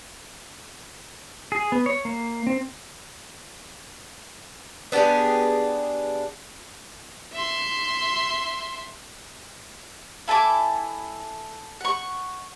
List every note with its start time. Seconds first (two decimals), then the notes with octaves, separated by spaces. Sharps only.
1.52 G#4
1.72 B3
1.86 C#5
2.05 A#3
2.47 C4
4.92 B3 D4 G4 G#4
7.33 E5 C6
10.28 E4 A4 G#5 D6
11.81 F#5 C#6